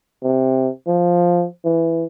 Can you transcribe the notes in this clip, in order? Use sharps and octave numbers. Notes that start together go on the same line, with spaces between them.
C3
F3
E3